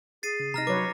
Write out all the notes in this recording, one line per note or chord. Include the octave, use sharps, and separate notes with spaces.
G#4 A6 C7 D#7
C#3
C3 D#4 A#5 F6 A#6
F#3 B4 C#5 D6